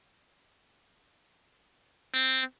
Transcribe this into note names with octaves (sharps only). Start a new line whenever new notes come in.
C4